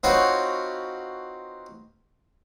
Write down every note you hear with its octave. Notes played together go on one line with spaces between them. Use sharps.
C4 D#4 F4 F#4 B4 C#5